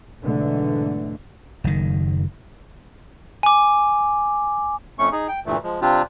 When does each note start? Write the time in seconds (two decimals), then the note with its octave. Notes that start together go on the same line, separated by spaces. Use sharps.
0.23 B1 G#2 B2 D3 E3 A3
1.64 F#1 D#3
3.43 G#5 D6
4.99 F2 A3 C#4 C#6
5.12 D#4 G#4
5.28 G5
5.46 D2 G2 A#2 E3 A3
5.63 F3 G#3
5.81 C3 G3 C4 D4 F4 G4